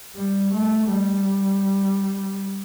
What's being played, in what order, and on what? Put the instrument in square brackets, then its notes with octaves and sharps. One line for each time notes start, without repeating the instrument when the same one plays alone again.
[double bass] G3
A3
G3